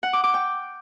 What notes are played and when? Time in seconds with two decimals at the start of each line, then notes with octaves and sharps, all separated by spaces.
0.03 F#5
0.13 D6
0.24 D6
0.34 G5